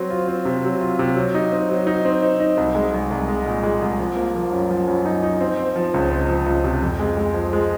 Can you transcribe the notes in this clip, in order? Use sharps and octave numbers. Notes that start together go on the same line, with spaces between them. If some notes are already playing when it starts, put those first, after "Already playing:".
Already playing: F#3 C4
F4
C4
C3
F#3
F4
C3
F#3
D#4
C4
F#3
D#4
C4
D#4
D#4
C2
G#3
C2
C2
G#3
A#2
G#3
C2
F3
A#3
F3
F#2
F3
F#2
D#4
D#4
C4
C4
F3
C#2
C4
F3
C#2
C3
F2
G#3
G#3
F3
G#3